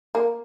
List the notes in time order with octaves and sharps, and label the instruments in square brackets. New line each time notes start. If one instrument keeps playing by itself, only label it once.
[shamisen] A#3